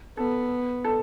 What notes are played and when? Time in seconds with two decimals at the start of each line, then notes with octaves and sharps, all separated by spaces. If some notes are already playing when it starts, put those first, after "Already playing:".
0.17 B3 A4
0.84 A4